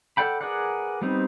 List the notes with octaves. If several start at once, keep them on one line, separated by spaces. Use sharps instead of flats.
A4 D5 F#5 G5 B5
G#4 A#4 B4 D5 F#5
G3 B3 C4 D#4